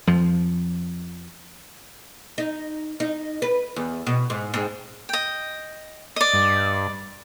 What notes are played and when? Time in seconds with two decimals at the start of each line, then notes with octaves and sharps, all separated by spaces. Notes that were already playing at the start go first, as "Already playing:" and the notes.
0.07 F2 F3
2.38 D#4
3.00 D#4
3.42 B4
3.76 E2
4.07 B2
4.30 G#2
4.54 G#2
5.09 D#5 G5
6.16 D5 D#5
6.34 G2